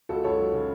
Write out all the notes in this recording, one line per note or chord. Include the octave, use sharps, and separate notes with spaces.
C#2 F#4 A4
C#2 A4 C#5
F#3
C#3